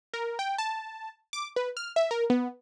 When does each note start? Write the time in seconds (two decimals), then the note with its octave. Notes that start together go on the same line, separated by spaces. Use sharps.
0.14 A#4
0.39 G5
0.58 A5
1.33 D6
1.56 B4
1.77 F6
1.96 E5
2.11 A#4
2.30 B3